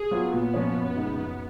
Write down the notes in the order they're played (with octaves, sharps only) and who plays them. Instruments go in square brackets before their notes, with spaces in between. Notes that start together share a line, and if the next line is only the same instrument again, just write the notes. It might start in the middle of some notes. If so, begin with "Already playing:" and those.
Already playing: [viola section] G#4
[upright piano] F#3 B3 F4
[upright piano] A#2 [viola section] B3
[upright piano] F3 A#3 C#4
F#2
C#3 G#3 D#4
F#2